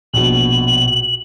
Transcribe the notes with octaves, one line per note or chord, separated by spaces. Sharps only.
A#1 B2 F#7